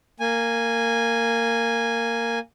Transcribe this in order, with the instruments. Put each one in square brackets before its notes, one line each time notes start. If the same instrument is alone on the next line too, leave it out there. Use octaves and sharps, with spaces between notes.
[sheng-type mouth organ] A#3 G#5